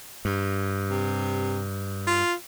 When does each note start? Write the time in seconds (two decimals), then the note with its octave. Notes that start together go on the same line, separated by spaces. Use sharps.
0.25 G2
0.91 C3
2.07 F4